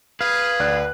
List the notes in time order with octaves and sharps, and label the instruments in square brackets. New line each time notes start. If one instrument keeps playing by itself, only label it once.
[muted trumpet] G#4 [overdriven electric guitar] B4 [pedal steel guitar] F5
[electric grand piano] D2 D5 F#6